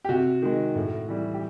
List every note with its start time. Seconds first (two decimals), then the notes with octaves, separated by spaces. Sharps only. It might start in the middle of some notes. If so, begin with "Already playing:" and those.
0.05 G4
0.09 C3 F#4
0.42 D#3 G#3
0.76 A2
1.08 E3 G3
1.34 G4